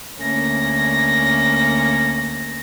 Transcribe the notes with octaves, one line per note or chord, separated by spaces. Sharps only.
D2 A#3 C#4 A#6